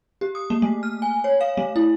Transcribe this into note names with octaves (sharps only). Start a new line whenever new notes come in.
G4
D#6
A#3
A3
F6
G#5
C#5
F5
A3
E4